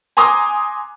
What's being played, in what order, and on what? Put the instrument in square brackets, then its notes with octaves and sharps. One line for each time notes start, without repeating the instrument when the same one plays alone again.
[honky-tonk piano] G#5 A#5 C6 D6 D#6